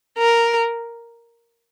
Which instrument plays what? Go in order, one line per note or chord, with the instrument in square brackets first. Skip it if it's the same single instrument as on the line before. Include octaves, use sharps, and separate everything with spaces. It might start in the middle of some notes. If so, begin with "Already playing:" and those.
[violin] A#4